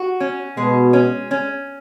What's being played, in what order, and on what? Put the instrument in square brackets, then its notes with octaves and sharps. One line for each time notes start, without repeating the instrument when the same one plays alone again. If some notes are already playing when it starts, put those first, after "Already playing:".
Already playing: [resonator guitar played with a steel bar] F#4
C#4
[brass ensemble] B2 [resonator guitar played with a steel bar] G#3
[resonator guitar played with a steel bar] C#4
C#4